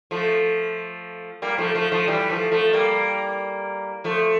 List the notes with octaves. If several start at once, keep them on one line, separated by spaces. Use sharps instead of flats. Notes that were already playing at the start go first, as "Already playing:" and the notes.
F3 A3
G3 A#3
F3 A3
F3 A3
F3 A3
E3 G3
F3 A3
F3 A3
G3 A#3
F3 A3